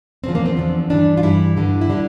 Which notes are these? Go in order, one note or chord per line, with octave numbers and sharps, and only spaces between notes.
E2 D3 F3 C4
A#3
C4
E2 D3 F3
G2 E3 G3 D4
F4
G2 E3 G3 E4
G2 D3 G3
E4
D3 G3 D4